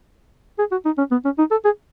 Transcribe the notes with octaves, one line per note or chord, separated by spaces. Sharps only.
G#4
F#4
D#4
C#4
B3
C#4
D#4
A4
G#4